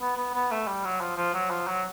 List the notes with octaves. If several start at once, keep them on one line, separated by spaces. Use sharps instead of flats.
B3
B3
B3
A3
G3
F#3
F3
F3
F#3
F3
F#3